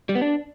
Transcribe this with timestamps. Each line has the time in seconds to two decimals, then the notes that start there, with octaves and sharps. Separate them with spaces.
0.09 G3
0.15 B3
0.21 D4